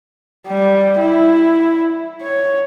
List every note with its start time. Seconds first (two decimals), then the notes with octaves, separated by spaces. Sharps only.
0.47 G3
0.99 E4
2.22 C#5